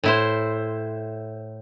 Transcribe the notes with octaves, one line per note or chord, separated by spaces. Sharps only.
A2 E4 C5